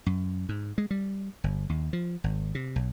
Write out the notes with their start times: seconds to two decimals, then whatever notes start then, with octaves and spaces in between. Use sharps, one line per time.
0.06 F#2
0.49 G#2
0.78 G#3
0.91 G3
1.44 G1
1.69 D#2
1.93 F3
2.24 G#1
2.55 C3
2.76 B1